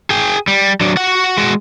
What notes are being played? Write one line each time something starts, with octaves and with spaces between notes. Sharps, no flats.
G#4 G5
G3
F#3 D4
F#4 F#5
G#3 F#4